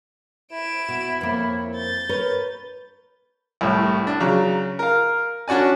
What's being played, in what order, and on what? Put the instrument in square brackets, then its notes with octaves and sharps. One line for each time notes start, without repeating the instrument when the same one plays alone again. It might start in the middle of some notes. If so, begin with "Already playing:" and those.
[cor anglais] E4 [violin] D7 E7
[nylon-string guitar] B2
[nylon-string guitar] F2 A#3 [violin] C4 C#5
[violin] G6 A6
[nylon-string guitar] A#4 B4 C#5
[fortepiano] C2 A2
D4
C#3 F#3 A#5
A#4 F5
C#4 D4 F#4 D5 G#5